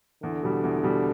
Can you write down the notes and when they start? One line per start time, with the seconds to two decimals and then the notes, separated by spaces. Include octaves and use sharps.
0.23 E2 D3
0.43 B2 G3
0.64 E2
0.83 B2 G3